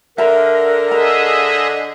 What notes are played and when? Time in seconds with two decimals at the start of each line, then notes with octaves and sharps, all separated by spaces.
0.18 D3 A#4 E5 A5 A#5
0.91 G#4 D#5 E5 A#5